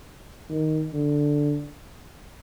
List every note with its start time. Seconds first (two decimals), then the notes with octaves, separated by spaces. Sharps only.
0.50 D#3
0.93 D3